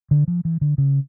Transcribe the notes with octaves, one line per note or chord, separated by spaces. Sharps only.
D3
F3
E3
D3
C#3